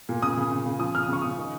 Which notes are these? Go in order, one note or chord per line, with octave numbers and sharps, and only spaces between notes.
A#2
C#3 D#6
C#3
C#3
C#3
F3 D#6
C#3 F6
D#6
C#3 C#6
C#3 D#6
D#3